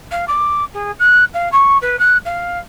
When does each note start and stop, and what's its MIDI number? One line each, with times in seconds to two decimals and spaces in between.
0.11 0.24 77
0.27 0.65 86
0.73 0.91 68
0.99 1.24 90
1.33 1.50 77
1.52 1.77 85
1.81 1.98 71
1.99 2.17 90
2.25 2.59 77